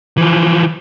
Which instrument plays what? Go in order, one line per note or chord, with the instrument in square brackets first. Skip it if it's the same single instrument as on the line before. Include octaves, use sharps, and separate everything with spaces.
[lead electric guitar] E3 F3